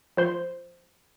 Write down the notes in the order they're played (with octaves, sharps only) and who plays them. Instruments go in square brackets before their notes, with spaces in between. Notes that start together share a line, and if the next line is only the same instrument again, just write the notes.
[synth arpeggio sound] F3 C5 C6